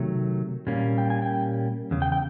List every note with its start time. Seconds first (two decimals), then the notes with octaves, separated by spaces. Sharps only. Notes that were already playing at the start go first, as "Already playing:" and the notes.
Already playing: C3 D#3 F#3 A3
0.67 A#2 G3 A#3 C#4
0.98 G5
1.10 G#5
1.22 G5
1.91 E2 C#3
2.02 G5
2.12 G5